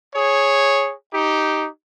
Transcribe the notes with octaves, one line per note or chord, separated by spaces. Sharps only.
G#4 C#5
D#4 G4